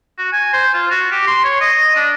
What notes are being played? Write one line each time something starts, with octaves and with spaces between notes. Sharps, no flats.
F#4
G#5
C5
F4
F#4
G4
C6
C#5
D#5
D4